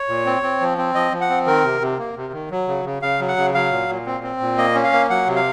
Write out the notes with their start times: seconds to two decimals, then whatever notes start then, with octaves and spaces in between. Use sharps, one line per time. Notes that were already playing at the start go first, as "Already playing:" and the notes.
Already playing: C#5
0.09 A#2
0.26 C4
0.43 C4
0.61 F3
0.78 C4
0.95 F3 D#5
1.12 F3
1.21 F#5
1.30 C4
1.47 D#3 A#4
1.64 C3
1.82 C3
1.99 A#3
2.16 C3
2.33 D#3
2.51 F#3
2.68 C#3
2.85 C#3
3.02 C#3 F5
3.20 F#3
3.28 F#5
3.37 C#3
3.54 F#3 F5
3.72 A#2
3.89 A#2
4.06 C4
4.23 C4
4.41 A#2
4.58 A#3 D#5
4.75 C#4
4.84 F5
4.93 A#3
5.10 F#3 F#5
5.27 C3
5.36 F5